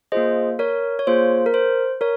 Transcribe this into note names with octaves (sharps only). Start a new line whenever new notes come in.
A#3 F4 G#4 C5 D#5
A#4 C#5
C#5
A#3 F4 G#4 C5
A#4
C5
A#4 C#5